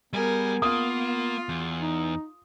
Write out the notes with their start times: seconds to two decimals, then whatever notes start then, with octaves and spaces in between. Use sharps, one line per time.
0.13 G3 B3 G#4 A#4
0.62 A#3 F4 D#6
1.49 E2
1.81 D#4